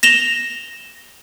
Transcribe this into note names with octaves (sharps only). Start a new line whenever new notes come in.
A#6 E7 F7 G7